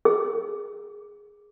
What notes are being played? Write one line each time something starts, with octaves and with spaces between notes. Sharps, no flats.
G#4